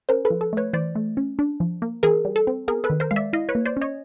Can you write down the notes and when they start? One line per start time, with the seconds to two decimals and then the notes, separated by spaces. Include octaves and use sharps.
0.09 C#4 A#4 C5
0.25 A4 B4
0.30 F3
0.41 A4
0.53 A3 B4 C#5
0.73 E3 C5 D5
0.95 A3
1.17 C#4
1.39 D4
1.60 F3
1.82 A#3
2.03 E3 G#4 A#4
2.25 G3
2.36 A4
2.47 C4
2.68 B3 G#4 A#4
2.84 A4 B4
2.90 D#3
3.00 A#4 C5
3.11 G#3 F5
3.16 D5 E5
3.33 E4 D#5 F5
3.49 B4 C#5
3.55 A#3
3.65 C5 D5
3.77 C#4 C#5 D#5